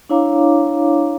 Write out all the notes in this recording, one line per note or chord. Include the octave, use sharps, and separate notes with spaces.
D4 E4 C#5 F5 A#5 D6